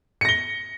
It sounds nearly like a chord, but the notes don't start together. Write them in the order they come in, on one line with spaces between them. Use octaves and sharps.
C#7 A#6 G7